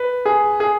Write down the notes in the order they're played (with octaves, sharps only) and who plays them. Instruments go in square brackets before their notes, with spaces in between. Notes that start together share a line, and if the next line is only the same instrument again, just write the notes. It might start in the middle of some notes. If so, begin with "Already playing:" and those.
Already playing: [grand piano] B4
G#4
G#4